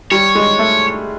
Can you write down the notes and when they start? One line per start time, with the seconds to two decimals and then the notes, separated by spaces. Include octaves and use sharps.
0.11 G3 C#5
0.35 G#3
0.59 A3